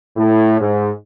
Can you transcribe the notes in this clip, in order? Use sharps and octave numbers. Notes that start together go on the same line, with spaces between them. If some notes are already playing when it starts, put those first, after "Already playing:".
A2
G#2